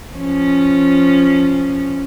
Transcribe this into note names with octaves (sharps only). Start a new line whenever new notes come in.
F3 C#4